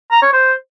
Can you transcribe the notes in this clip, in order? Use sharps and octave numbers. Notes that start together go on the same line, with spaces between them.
A#5
C#5
C5